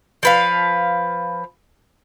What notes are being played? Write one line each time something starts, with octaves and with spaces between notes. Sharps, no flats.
F3 B4 F5